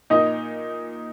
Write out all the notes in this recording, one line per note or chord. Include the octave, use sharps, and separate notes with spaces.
A#2 D#4 D#5